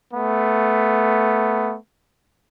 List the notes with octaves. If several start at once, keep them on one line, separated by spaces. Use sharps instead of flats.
A3 B3